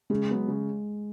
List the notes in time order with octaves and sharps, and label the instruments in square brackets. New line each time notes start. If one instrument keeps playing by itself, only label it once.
[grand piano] C#3 [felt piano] G#3
[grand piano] F#3 B3
C#3